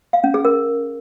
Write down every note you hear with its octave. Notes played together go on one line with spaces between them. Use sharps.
F5
C#4
G#4
A#4